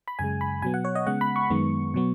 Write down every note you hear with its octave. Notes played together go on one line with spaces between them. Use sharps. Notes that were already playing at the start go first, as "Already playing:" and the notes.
B5
F#2 C#3 G#3 G#5
B5
B2 F#3 B3 G#5
F#5
C#5
D#5
C#3 G#3 B3 F#5
B5
C#6
F#2 D#3 G#3 B3
B2 F#3 B3